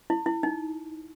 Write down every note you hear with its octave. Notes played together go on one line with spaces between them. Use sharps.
E4
E4
D#4